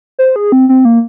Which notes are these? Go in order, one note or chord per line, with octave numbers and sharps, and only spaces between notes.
C5
G#4
C4
C4
A#3